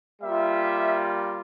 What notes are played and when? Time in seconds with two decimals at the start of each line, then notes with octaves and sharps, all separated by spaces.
0.22 G3 A#3 F4 E5